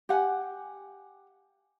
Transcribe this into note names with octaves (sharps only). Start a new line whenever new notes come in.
G4 F#5 G#5